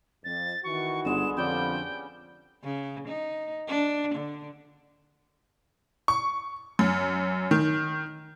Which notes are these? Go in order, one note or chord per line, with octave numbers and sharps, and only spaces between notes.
F2 A6
D#3 E3 F#4 C#6
G1 D3 G#3 B3 E7
F2 D3 F3 G3 C#4 D5 F#5 G5
C#3
D#4
D4
D3
C#6
F#2
D#3